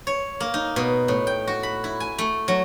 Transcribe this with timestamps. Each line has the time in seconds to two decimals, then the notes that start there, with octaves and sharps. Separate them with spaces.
0.07 C#5
0.40 A#3
0.54 D#4
0.76 B2
1.08 A2
1.27 G5
1.47 F#4
1.63 B5
1.84 E4
2.00 G#5
2.18 A3
2.48 F#3